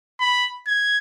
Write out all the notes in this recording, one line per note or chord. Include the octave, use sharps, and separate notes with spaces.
B5
G#6